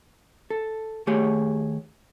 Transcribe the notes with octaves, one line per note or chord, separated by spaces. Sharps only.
A4
D#2 A3 G4 G#4 C#5